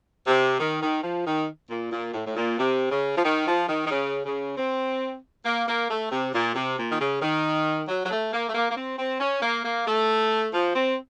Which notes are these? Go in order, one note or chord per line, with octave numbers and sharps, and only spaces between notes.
C3
D#3
D#3
F3
D#3
A#2
A#2
A2
A2
A#2
C3
C#3
F3
D#3
F3
D#3
D#3
C#3
C#3
C4
A#3
A#3
A3
C3
A#2
C3
A#2
D#3
C#3
D#3
F#3
F#3
A3
A#3
A3
A#3
A#3
C4
C4
C#4
A#3
A#3
A3
F3
C4